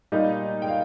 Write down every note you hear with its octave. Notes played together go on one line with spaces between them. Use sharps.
A#2 G3 A#3 D#4 D#5
G5
F5